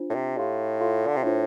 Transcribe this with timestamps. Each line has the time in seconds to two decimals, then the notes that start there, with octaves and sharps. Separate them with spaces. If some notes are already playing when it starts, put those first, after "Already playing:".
Already playing: D4 F4 C5
0.09 A2
0.15 C3
0.37 A2 G4 F5 C6
0.80 F4 A4 F5 C6
1.07 D3
1.16 C3
1.24 A2 D4 F4 C5